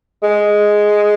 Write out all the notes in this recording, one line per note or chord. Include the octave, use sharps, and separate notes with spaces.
G#3